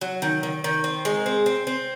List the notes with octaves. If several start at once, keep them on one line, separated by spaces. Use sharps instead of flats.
F#3
D#3
D#3
D#3
C4
G#3
C4
C4
C4